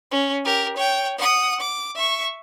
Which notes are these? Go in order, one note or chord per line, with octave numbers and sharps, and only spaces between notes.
C#4
G4 A#4
C#5 G5
F#5 D#6
D6
E5 C#6